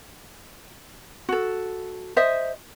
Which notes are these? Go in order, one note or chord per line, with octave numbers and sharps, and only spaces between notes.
F#4 A4
C5 D#5 E5